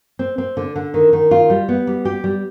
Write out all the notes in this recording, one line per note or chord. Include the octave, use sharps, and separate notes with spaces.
C4
C4
D3
D3
D#3
D#3
F4
G3
B3
G3
G4
G3